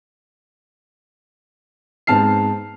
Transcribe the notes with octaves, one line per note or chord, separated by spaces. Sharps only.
G#2 B3 C4 A5 F6 C7